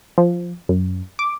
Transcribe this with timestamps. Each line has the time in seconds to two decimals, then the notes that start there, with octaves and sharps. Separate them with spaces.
0.18 F3
0.69 F#2
1.19 D6